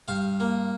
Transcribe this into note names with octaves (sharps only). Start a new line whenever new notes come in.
G2 F5
A#3